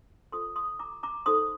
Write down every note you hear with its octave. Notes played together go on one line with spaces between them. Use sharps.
F4 A4 C5 C6 D#6
C6 D#6
A#5 D6
A#5 D6
D#4 A4 C5 C6 D#6